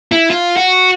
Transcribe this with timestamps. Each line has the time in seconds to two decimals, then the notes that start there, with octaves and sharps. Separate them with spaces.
0.12 E4
0.30 F4
0.57 F#4